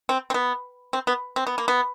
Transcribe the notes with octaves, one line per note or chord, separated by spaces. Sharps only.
C4
C4
B3
C4
B3
C4
B3
A#3
B3